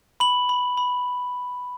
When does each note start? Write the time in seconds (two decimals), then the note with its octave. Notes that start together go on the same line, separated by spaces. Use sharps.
0.20 B5 F#7
0.49 B5
0.77 B5